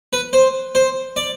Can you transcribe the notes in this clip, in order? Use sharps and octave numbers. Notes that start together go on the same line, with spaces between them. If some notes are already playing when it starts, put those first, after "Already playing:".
B4
C5
C5
D5